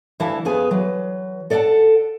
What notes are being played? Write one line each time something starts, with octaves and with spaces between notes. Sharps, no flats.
D2 E3 E4 E5 F5 A5
F2 B3 G#4 B4 G#5
E3 F#3
A4 D5 D#5 F5 F#5 A5